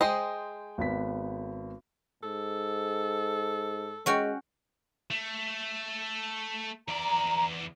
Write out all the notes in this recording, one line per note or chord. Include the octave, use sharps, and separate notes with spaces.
G#3 C5 D#5 G5 D#6
G#1 B3 B6
G#2 A4
G#3 C#4 F#4 G5
A3
E2 D5 A#5